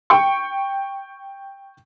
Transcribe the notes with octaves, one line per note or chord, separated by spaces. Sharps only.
G5 C#6